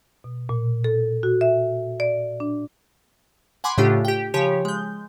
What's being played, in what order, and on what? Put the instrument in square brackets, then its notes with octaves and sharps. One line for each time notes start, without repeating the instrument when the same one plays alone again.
[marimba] B2
A#2
A4
F#4
E5
D5
D4
[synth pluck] F#5 G#5 B5 C6 D6
A2 C#3 A3 D4 F4 G4
G4 G5
C#3 F3 G4 C#5
G#3 G6